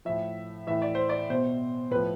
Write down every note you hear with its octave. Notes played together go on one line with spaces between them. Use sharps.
A2 F3 E5
A2 E3 E5
D5
C5
D5
B2 C5
A2 F3 B4